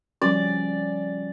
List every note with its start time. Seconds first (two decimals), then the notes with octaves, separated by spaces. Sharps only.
0.22 F3 G3 C#4 D5